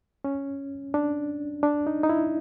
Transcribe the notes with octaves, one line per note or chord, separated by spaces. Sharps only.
C#4
D4
D4
D#4
D#4
E4